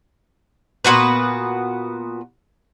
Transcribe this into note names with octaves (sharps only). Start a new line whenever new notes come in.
A#2 B3 F#4 B4